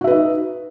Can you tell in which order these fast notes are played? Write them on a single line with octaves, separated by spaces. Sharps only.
F#4 E5 B4 D#4